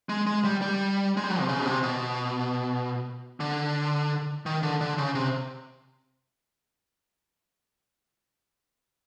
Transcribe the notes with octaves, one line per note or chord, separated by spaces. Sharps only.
G#3
G#3
G3
G3
G#3
G3
F#3
C3
C#3
B2
C3
B2
D3
D#3
D3
D3
C#3
C3